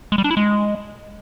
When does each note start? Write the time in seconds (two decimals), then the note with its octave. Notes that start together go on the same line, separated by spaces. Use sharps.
0.12 G#3
0.18 G3
0.24 D4
0.31 E4
0.37 G#3